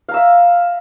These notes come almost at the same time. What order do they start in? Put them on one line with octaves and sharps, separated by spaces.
F5 A#5 E6 E5